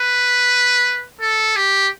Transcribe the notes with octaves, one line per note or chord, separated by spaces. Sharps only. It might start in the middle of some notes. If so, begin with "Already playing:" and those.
Already playing: B4
A4
G4